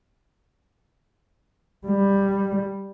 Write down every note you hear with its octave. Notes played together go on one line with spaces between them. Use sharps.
G3